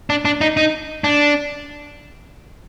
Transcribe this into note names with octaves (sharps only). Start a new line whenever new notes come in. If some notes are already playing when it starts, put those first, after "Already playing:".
D4
D4
D#4
D#4
D4